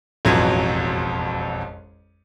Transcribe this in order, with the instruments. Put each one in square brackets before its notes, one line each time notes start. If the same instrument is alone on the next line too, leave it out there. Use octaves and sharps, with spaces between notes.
[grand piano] E1 A1 F2 F#3 G#6